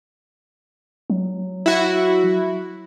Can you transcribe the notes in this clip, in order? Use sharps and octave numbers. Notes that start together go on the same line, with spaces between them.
F#3
E4 F#4